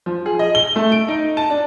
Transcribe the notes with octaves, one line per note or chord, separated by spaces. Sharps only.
F3
G#4
D#5
G7
A3
D7
D#4
A5
D4